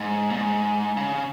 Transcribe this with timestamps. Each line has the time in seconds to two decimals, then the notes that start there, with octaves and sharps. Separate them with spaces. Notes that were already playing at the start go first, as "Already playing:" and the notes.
Already playing: G#2
0.31 A#2
0.37 G#2
0.97 C#3